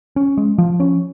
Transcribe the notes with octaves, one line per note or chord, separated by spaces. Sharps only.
C#4
G#3
F3
C#4